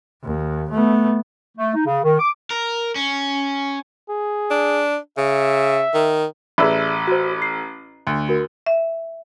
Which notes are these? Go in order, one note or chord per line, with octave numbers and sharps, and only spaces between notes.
D#2
A3 B3
A3
D#4
C#3
D#3
D6
A#4
C#4
G#4
D4
C#3 E5
D#3
A1 G#4 B4 D5 E5 E6
F#4 C5
C7
D2
F#4 A#4
E5